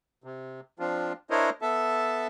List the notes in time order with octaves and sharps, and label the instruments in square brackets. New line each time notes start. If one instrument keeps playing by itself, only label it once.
[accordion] C3
F3 C4 D4 F4
D4 E4 A#4 C5 C#5 D#5
B3 A4 E5 A5